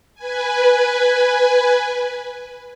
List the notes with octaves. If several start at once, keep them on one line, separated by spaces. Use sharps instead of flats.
B4 G#5